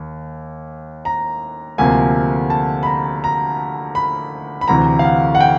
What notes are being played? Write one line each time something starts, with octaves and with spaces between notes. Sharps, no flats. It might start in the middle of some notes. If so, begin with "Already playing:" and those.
Already playing: D#2
A#5
D2 C3 F3 A#3 G#5
A5
B5
A#5
A#5
B5
B5
D2 C3 E3 A#5
F5
F#5
F#5
G5